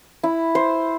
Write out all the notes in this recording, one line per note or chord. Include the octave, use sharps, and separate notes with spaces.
E4
C5